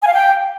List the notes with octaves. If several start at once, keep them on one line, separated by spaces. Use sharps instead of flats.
G#5
F5
G5